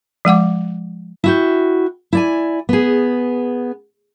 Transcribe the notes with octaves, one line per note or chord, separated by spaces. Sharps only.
F3 G#3 F#5 D6
E4 F#4 G5
E4 D5 G#5
B3 G#4